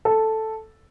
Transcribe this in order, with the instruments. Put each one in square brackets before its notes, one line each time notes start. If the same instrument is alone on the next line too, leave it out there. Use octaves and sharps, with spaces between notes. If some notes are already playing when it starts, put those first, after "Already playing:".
[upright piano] A4